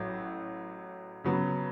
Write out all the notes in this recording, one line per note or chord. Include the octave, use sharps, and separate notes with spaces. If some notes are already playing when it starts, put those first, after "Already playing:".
Already playing: A1 A2 F#3
C#3 F#3 B3